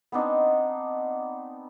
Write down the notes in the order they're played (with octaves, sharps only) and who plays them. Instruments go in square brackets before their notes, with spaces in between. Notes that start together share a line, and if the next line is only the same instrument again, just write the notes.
[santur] B3 C4 D4 D#4